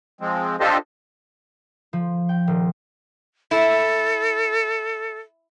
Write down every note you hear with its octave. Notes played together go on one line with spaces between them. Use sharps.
F3 G#3 C4
D4 F4 G4 A4 C5 D#5
F3
G5
D#1
E4 A4